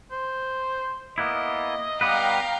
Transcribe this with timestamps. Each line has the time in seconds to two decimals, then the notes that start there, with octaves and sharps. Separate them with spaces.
0.11 C5
1.18 A#3 B3 E4 D#5
2.01 G3 B3 B4 F5 G5 A#5